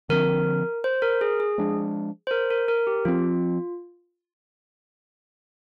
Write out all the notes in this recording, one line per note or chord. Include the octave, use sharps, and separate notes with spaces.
D3 F3 C4 A#4
C5
A#4
G#4
G#4
F3 G#3 D4
C5
A#4
A#4
A#4
G4
F3 C4 F4